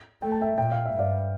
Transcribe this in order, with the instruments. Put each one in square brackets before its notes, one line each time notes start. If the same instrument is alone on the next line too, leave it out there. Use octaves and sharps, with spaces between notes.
[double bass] A3 [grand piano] G5
[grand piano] A5
E5 G5
[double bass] A#2 [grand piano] G5
[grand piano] F5
E5
[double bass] G2
[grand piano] D5 F5